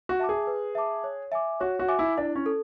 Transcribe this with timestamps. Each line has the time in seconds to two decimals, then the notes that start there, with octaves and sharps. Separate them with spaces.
0.09 F#4
0.20 E5 A5 D6
0.29 G#4
0.47 B4
0.75 E5 A5 D6
1.04 C#5
1.32 E5 G#5 D6
1.60 F#4 C#5
1.79 F#4
1.88 E5 G#5 D6
1.99 E4
2.18 D4 E4
2.35 C#4
2.46 A4